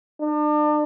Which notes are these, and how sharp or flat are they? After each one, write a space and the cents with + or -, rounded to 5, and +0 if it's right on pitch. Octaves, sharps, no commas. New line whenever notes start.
D4 +35